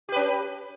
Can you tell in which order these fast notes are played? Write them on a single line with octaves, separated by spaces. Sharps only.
G4 B4 C#4